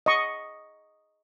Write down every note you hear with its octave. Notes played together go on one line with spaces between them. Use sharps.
D#5 C#6